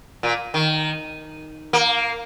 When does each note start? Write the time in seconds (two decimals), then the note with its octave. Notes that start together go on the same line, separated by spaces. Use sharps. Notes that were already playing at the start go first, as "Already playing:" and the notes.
0.23 A#2
0.54 D#3
1.73 A#3